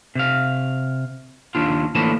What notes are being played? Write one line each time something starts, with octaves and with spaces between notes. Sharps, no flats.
C3 F5
D#2 D4 F4
A2 D3 E3 F3 A#3 A5